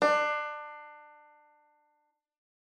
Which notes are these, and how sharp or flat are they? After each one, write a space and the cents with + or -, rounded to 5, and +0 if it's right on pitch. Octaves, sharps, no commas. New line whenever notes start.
D4 +25